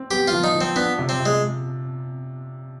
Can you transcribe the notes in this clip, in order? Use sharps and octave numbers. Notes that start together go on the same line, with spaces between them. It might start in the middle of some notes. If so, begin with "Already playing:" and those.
Already playing: C4
B3 G4
F3 F4
D#4
F3
C4
B3 D4
C3
C4
C3
G#3